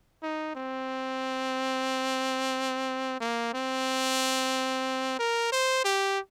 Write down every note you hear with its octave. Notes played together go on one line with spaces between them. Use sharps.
D#4
C4
A#3
C4
A#4
C5
G4